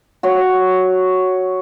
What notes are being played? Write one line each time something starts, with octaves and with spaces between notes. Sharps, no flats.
F#4 C#5